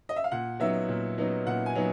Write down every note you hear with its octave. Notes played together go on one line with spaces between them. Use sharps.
D#5
E5
F5
A#2 F#5
F#3 B3 D#4 E5
A#2
F#3 B3 D#4
A#2 F#5
G#5
F#3 B3 D#4